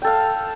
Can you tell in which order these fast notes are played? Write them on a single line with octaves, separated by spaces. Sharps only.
G5 A4 F5